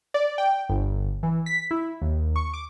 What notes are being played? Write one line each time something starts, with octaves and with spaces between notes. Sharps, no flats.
D5
G5
G1
E3
B6
E4
D#2
C#6
D6